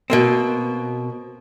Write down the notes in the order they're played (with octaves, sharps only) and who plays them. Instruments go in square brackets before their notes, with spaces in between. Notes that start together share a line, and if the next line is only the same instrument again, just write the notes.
[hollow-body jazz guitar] B2 A#3 C4